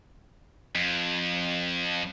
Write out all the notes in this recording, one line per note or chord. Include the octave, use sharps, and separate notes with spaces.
F2